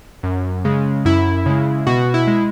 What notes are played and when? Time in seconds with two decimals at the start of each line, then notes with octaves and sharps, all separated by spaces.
0.23 F#2
0.65 C#3 G#3
1.05 F#2 E4
1.46 C#3 G#3
1.87 B2 F#4
2.14 E4
2.27 G#3